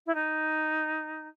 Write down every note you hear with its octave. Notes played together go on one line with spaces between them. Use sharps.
E4
D#4